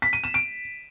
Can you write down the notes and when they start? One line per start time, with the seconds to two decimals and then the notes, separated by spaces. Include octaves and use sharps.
0.02 B6
0.13 D#7
0.24 E7
0.34 D7